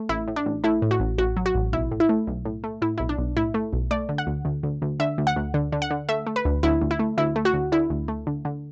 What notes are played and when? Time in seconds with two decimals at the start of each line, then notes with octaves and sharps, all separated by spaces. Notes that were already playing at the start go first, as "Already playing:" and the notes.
Already playing: A3
0.09 A1 E4
0.28 A2
0.36 D4
0.46 A1
0.64 A3 E4
0.82 A2
0.91 F#4
1.00 A1
1.18 A1 F#4
1.37 F#3
1.46 F#4
1.55 A1
1.73 B1 E4
1.91 A2
2.00 E4
2.09 A3
2.27 B1
2.45 A2
2.64 A3
2.82 A2 E4
2.98 B1 E4
3.09 D4
3.18 B1
3.37 A2 E4
3.54 A3
3.73 B1
3.91 A3 D5
4.09 D3
4.18 F#5
4.27 D2
4.45 D2
4.63 D2
4.82 D2
5.00 D3 E5
5.18 D2
5.27 F#5
5.36 D2
5.54 D3
5.72 D3
5.82 F#5
5.91 D3
6.09 A3 E5
6.27 A3
6.36 B4
6.45 D2
6.63 D2 E4
6.81 D2
6.91 E4
6.99 A3
7.18 D2 E4
7.36 A3
7.45 F#4
7.54 D2
7.72 D3 E4
7.90 D2
8.08 A3
8.27 D3
8.45 D3